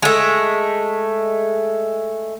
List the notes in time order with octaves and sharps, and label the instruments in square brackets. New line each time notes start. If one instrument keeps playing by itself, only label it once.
[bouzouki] G#3 A3